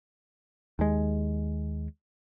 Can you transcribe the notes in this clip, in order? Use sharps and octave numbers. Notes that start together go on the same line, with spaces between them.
D#2 G#3